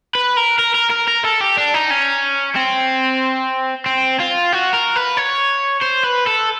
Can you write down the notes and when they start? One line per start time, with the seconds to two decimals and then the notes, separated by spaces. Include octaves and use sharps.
0.15 B4
0.37 A#4
0.59 A#4
0.75 A#4
0.91 A#4
1.08 A#4
1.25 A4
1.40 G4
1.57 D4
1.74 D#4
1.90 C#4
2.56 C4
3.86 C4
4.20 F4
4.52 F#4
4.73 A#4
4.96 B4
5.17 C#5
5.82 C5
6.04 B4
6.27 A4